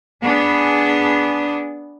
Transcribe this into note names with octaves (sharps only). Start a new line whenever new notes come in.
B3 D4 G#4